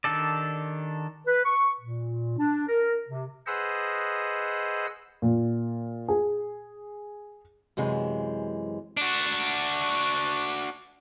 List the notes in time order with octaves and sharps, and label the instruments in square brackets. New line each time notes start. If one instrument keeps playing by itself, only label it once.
[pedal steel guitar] D#3 D4 G4 A4 D5
[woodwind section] B4
C#6
A#2
D4
A#4
C3
[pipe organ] G#4 B4 C5 D#5 F#5 E6
[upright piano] A#2
G#4
[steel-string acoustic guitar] F#2 C3 E3 G#3
[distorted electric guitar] D4 F#4